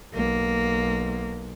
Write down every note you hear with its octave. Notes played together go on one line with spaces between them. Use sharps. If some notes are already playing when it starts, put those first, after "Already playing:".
B1 A#3